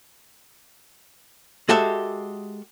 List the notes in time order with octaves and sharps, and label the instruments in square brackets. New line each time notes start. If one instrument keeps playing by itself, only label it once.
[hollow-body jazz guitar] G#3 F#4 G4 A4 E5